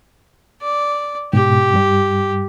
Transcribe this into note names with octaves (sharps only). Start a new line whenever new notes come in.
D5
G#2 B2 G4
G2 G3